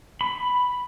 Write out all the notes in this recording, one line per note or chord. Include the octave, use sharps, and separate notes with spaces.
B5